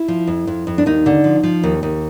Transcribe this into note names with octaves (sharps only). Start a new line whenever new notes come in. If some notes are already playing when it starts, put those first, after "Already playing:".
Already playing: E4
F3
F2
F2
F2
D4
D#2 D#4
D3
F3
F3
D#2
D#2